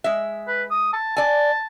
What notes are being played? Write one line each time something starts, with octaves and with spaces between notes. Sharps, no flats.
G#3 E5
B4
D#6
A5
D5 G#5 A5